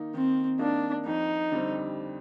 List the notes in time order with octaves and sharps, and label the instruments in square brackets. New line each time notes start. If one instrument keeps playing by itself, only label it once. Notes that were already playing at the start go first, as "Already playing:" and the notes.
Already playing: [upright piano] D#3 A#3 D#4
[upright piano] D#3 [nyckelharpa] C4
[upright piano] A#3 D#4 [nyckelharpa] D4
[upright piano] F2 [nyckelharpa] D#4
[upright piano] D3 G3 C4